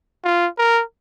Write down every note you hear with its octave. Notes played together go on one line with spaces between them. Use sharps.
F4
A#4